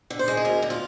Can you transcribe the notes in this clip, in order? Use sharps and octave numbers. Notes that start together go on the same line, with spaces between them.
D3
C5
G#3
G#4
D2 A#4
D3
F4